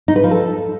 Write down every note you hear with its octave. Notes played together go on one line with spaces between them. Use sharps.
D#4
B4
F3
A4